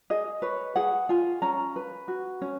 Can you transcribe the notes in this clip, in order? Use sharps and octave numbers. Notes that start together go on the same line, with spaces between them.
G#4 D#5
B4 C#5
G#4 F#5
F4 G#5
C#4 A#5
B4
F#4
C#4